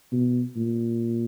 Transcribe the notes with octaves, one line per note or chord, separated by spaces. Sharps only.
B2
A#2